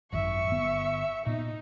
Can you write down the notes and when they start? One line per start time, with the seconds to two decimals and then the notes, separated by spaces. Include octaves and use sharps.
0.13 G#1 F#2 D#3 E5 C#6
0.49 G1 B3
1.27 A#2 B3 D#4